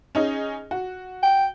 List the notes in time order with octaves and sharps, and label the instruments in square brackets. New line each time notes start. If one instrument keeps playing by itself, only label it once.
[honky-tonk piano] C#4 D#4 G#4
F#4
[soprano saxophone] G5